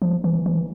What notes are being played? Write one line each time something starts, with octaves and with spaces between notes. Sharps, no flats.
F3
E3
E3